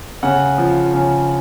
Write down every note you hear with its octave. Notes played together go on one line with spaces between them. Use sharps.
C#3 F#5
F3
C#3